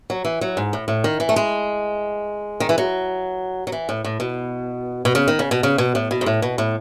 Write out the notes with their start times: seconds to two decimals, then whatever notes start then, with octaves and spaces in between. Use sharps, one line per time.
0.10 F#3
0.25 E3
0.41 F#3
0.57 G#2
0.73 A2
0.88 A2
1.04 D#3
1.20 E3
1.29 A3
1.36 G#3
2.60 D#3
2.69 E3
2.78 F#3
3.67 F#3
3.72 E3
3.89 A2
4.05 A2
4.20 B2
5.05 B2
5.15 C#3
5.28 D#3
5.39 C#3
5.51 B2
5.63 C#3
5.78 B2
5.95 A2
6.11 B2
6.21 G#2
6.26 A2
6.42 B2
6.58 A2